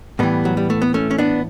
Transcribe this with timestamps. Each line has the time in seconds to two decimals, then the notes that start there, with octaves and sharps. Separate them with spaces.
0.19 A2 E3 G3 B3
0.45 F#3
0.57 G3
0.70 A3
0.82 B3
0.94 A3 C#4
1.11 C#4
1.19 B3 D4